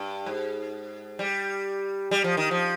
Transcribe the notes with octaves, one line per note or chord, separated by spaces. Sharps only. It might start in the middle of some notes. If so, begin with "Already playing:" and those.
Already playing: G2
G#2
G3
G3
F3
D#3
F3